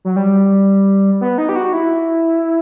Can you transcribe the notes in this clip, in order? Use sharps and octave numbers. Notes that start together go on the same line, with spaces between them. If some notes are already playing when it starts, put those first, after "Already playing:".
F#3
G3
B3
D#4
G4
F#4
E4